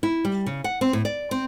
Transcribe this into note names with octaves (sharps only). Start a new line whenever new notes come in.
E4
G3
C#3
F#5
C4
A2
D5
C4